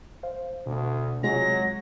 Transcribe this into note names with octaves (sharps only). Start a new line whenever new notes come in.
C5 F5
D2 B2
C3 F#3 G#3 F4 A#6